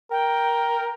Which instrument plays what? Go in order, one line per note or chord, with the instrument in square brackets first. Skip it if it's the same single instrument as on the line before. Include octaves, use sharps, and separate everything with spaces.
[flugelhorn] A#4 [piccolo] G5